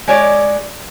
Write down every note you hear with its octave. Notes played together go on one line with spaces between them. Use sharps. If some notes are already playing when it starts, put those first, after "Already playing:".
G#3 C#5 D5